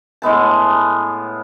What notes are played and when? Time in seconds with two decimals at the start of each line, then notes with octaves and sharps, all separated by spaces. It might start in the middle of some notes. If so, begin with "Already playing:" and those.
0.22 A2 G#3 B3 A5